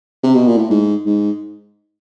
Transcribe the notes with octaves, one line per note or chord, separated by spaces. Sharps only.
C3
B2
A#2
A2
G#2
G#2